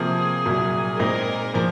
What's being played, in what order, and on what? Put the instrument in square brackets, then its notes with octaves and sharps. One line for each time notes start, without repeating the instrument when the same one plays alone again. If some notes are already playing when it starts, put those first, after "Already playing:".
Already playing: [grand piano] C3 F3 A#3 [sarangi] G#4
[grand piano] C2 A#2 F#3
[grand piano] A#2 G#3 C4 D#4 [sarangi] A#4
[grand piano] A#2 F3